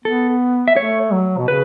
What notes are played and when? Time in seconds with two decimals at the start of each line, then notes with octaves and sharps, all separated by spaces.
0.04 B3 A4
0.68 E5
0.76 A3 C#5
1.12 F#3
1.38 B2
1.48 C#3 B4